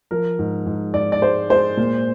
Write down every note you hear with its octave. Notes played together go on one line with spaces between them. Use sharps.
F3 A#4
G#2
G#2
G#2 D5
D5
G#3 C5
G#3 C5
A#2